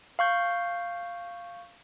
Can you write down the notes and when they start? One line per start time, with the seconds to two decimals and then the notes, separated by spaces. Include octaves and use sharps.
0.19 F5 C#6 G6